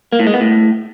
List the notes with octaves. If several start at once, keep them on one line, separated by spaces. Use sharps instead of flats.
A#3
A2
G#3
B3
A2